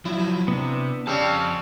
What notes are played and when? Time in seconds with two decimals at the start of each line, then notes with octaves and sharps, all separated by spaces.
0.05 F3 F#3 E4
0.48 C3 B3 D4
1.07 F2 C#3 G3 A5 E6 F6 G6